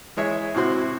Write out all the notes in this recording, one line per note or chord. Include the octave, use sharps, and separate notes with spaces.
E3 G#3 C#5 E5
A2 C3 E4 F#4 C5 C6